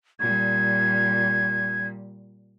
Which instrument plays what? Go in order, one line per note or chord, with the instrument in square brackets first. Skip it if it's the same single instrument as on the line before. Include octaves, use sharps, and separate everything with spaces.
[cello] A#2 G3 [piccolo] G#6